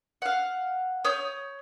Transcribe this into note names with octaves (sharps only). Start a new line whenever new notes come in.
F5 F#5
C#5 D#6 G6